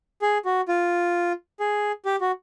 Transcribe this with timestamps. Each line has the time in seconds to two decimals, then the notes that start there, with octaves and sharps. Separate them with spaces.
0.22 G#4
0.45 F#4
0.68 F4
1.60 G#4
2.05 G4
2.21 F#4